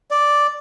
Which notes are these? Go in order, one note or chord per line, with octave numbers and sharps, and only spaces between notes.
D5